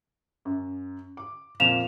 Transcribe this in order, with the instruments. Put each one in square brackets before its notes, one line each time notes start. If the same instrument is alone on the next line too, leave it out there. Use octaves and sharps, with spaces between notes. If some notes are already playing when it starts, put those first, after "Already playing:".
[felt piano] F#2
D6
[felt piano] F2 A#2 [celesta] F5 E7 F7